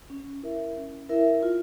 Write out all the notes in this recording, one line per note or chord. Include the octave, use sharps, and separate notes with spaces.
C#4
E4 A#4 E5
C#4
E4 A#4 E5
F4